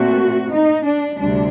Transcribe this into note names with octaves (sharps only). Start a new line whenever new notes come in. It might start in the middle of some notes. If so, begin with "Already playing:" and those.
Already playing: A#2 A3 C4 F#4
D#4
D4
D2 C3 G3 D4